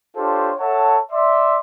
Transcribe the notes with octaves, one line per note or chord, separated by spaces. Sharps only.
D4 F4 G4 A4 C5 C#5
A4 C#5 E5 F#5 A5
D5 E5 C6